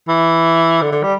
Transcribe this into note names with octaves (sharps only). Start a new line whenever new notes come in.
E3
D3
D3
G3